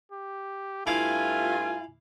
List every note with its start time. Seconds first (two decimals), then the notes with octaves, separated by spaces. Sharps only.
0.12 G4
0.87 G2 A3 E4 F4 F5 G#5 D6